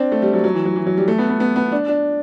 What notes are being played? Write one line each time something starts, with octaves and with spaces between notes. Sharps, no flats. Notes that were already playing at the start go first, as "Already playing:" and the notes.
Already playing: C4 D4
A3
G3
F#3
F#3
E3
F#3
E3
F#3
G3
A3
B3
B3
B3
B3
D4
D4